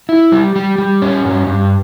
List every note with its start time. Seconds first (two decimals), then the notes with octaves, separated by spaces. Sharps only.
0.09 E4
0.32 G3
0.56 G3
0.78 G3
1.02 C#4
1.25 G2
1.47 G2